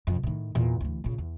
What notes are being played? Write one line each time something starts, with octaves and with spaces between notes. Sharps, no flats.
F2 C3
A2 D#3
E2 A#2
D2 E3
A#2 C#3
E2